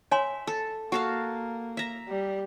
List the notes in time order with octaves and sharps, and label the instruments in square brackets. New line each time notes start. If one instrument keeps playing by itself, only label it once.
[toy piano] C#5 G#5 C6 [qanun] E5
[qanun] A4
[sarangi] A#3 [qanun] F#4 A4 F5 [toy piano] F#5
[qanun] E5 A#5
[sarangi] G3